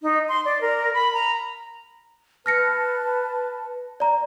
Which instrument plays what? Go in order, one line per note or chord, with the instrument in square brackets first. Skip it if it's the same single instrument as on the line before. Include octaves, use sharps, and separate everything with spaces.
[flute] D#4
C6
D5
A#4
B5
A#5
[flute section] B4 A5 [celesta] F6 A#6 C#7
[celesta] D5 A#5